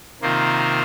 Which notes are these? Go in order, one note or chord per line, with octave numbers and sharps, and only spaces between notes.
C3 D#3 A#3 F4 C5